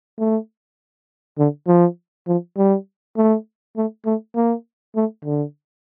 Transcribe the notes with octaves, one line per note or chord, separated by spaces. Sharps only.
A3
D3
F3
F3
G3
A3
A3
A3
A#3
A3
D3